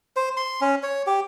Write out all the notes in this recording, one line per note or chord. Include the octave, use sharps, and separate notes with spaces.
C5
C6
C#4
C#5
G4